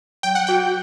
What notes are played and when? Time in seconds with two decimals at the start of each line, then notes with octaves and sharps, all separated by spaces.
0.23 F#3 G5
0.35 F#5
0.47 F#4 G5